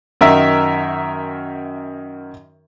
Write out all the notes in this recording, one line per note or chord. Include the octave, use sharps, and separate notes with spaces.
F#2 D#3 A#4 E5